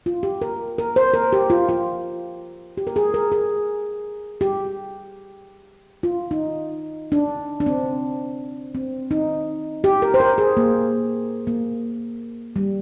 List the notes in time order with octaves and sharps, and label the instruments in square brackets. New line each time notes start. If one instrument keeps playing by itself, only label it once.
[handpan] F4
G4
A#4
A#4
C5
A#4
G4
F4
F4
G4
A#4
G#4
A#4
G#4
G4
F4
D#4
D4
D4
C4
C4
D#4
G4
A#4
C5
A#4
G#4
A#3
A#3
G3